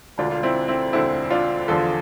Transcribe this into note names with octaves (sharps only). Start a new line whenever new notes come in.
E1 D2 D3 D4 F4
F4
C4 E4
C4 E4
E1 D2 D3 C4 E4
D4 F4
E2 D3 F3 F4 A4